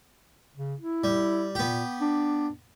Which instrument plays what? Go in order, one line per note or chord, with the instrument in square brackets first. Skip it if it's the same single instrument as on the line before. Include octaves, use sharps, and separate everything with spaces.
[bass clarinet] C#3
E4
[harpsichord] G3
[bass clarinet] A#2 [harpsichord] B3 G4
[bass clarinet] D4